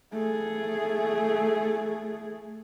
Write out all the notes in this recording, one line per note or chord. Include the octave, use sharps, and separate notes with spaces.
A3 G#4